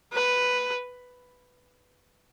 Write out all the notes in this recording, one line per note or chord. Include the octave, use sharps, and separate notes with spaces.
B4